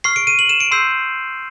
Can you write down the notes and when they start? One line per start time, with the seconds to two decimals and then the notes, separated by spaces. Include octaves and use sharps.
0.04 C#6 F6 C7
0.16 D7
0.27 D#7
0.39 F#7
0.49 E7
0.60 D7
0.71 C6 E6 G6 C7